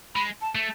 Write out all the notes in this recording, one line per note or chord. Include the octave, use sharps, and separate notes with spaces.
G#3 B5
A5
A3